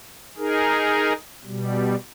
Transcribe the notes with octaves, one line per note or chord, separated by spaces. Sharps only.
D#4 G#4 A#4
B2 G3